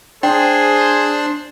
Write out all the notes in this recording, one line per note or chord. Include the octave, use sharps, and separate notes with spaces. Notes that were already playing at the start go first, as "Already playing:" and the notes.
D4 G#4 C5 G5